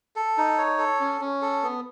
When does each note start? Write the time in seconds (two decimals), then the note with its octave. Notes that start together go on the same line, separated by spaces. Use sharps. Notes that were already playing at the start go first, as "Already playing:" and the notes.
0.16 A4
0.38 D#4
0.58 C#5
0.79 A4
1.00 C#4
1.21 C#4
1.42 A4
1.63 B3